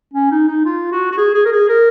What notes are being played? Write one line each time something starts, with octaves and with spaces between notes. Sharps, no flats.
C#4
D#4
D#4
F4
F#4
F#4
G#4
G#4
A#4
G#4
A#4